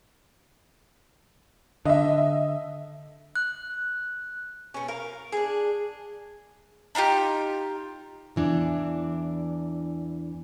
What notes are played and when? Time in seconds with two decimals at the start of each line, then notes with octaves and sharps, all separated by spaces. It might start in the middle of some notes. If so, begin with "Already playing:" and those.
1.85 D3 D#5 E5
3.35 F#6
4.74 B2 C#4
4.88 A#4 F5
5.32 D4 G#4
6.95 D4 D#4 F4 G4
8.36 E2 E3 D4